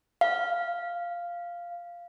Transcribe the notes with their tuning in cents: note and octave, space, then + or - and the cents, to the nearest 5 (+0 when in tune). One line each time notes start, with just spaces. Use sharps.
F5 -5